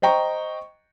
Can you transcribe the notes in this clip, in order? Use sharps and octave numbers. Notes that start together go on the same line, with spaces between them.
C5 D#5 G5 A#5 C#6